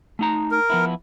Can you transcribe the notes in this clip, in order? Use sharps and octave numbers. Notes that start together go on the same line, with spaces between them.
A3 D#4 A#5
A#4
F3 B3 E4